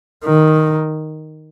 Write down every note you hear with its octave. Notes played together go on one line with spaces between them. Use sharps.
D#3